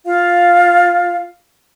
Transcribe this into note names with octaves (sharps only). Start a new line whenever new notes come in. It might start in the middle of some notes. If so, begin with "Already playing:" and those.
F4 F5